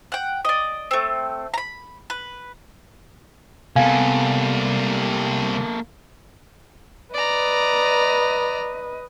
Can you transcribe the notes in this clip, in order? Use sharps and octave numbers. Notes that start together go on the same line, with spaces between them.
F#5 G5
D5 D#5
A3 C4
A#5 B5
B4
C3 G3 A#3 B3 A4 F5 G#5
B4 D5 D#5 A#5